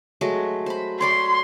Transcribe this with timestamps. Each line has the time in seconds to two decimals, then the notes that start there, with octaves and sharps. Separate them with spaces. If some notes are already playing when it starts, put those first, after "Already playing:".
0.21 F#3 G#3 A3
0.66 C5 B5
1.01 C#5 D5 B5 C6